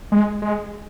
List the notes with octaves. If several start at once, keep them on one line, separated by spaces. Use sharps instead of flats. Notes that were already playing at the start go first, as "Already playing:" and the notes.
G#3
G#3